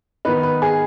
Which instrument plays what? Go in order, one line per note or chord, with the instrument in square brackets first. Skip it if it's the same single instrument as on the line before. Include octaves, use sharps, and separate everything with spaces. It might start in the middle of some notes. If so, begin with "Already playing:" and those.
[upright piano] D#3 B3 D#4 B4
B4
G#4